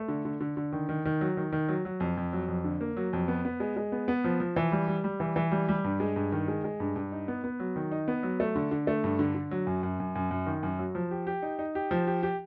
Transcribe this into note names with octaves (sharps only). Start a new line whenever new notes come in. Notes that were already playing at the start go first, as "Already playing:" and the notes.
Already playing: A3
D3
D3
D3
D3
D#3
D#3
D#3
F#3
D#3
D#3
F#3
F#3
F2
F2
F#3
F2
D3
A#3
F#3
F2
B3
B3
G#3
G#3
B3
B3
F3
F3
E3
G3
G3
G3
E3
E3
G3
G3
G2
G#3
G2
D#3
G#3
G#3
G2
G2
D#4
B3
B3
F#3
D#3
D#4
B3
F#3
A3
D3
D3
A3
G2
D3
D3
F#3
F#2
F#2
F#2
F#2
F#2
D#3
F#2
F#3
F3
G4
G4
D#4
D#4
G4
F3
G4
G4